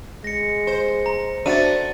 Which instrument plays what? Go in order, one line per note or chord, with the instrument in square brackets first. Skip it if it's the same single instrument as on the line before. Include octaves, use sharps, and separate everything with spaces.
[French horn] G#3 [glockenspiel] A#6 C#7
[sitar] C5
[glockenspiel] A#5
[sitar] A3 [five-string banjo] D4 F#4 [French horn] C5 [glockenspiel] A6 D#7